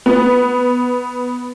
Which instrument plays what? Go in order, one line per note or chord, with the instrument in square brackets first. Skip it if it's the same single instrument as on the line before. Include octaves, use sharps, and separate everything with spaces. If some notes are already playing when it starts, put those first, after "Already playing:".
[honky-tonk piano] B3